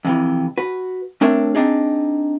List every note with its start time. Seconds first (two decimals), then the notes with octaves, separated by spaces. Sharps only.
0.05 F2 C3 E3
0.58 F#4 B4
1.21 A3 C4 D4 A#4 C#5 E5
1.55 C4 D4 D#4 G#4